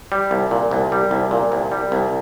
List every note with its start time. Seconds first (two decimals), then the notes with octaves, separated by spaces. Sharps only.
0.12 G3
0.31 C2
0.51 A#2
0.71 C2
0.92 G3
1.11 C2
1.31 A#2
1.52 C2
1.72 G3
1.92 C2